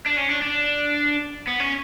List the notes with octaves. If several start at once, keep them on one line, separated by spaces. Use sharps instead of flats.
D4
C#4
D4
D4
B3
C#4